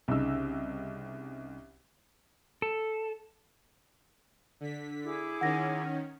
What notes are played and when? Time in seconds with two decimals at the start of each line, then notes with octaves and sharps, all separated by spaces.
0.08 C2 C#3 D#4 E6
2.62 A4
4.60 D3 B6
5.04 E4 G#4 D6
5.41 D#3 C#4 F#5 A#6